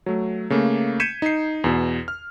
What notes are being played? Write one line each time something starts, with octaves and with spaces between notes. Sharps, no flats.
F#3 A3
C#3 A3 A#3
G6 G#6 B6 C#7 D#7 E7
D#4 C7
E2 B2
F6